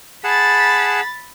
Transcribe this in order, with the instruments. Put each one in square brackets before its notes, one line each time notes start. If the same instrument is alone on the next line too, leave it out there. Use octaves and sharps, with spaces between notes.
[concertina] G#4 F#5 A5 [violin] B5 A6